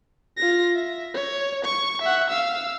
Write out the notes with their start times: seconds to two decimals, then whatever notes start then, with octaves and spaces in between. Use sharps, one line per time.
0.37 F4 A#6
0.75 E5
1.14 C#5
1.64 C#6
2.01 E5 F#5
2.30 F5 E6